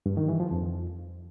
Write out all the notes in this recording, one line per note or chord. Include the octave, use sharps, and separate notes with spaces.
G2
D#3
E3
F3
F2